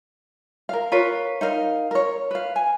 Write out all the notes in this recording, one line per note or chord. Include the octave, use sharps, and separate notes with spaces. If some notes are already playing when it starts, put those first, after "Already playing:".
A#4 F5
F4 A#4 B4 C#5
D#4 A#4 F5
A#4 C#5
B4 F5
G#5